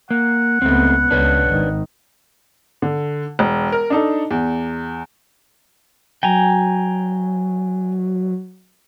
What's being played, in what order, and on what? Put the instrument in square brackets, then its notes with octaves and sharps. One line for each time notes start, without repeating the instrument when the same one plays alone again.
[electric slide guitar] A#3 [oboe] F#5
[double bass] C#2 B3 [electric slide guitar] A3 C4
[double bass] C#2 [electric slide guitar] D4 B4 C#5
[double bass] G#1 D#3
[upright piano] D3
E1
A#4
D4 D#4 A4
E2
[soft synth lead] F#3 [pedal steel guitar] G5 G#5 A#5